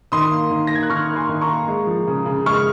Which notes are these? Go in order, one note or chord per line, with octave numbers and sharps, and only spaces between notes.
D#3 C6 D#6
A#3
D#3
A#6
A#3 G#6
F#6
D#3 C#6 F6
A#3
G#5 C6
D#3
A#5 C#6
A#3
G#3
F3
C#3
C#3
G#3 C#6 F6